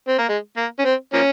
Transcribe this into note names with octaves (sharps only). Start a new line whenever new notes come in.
C4
A#3
G#3
A#3
C#4
C4
F3 A#3 C#4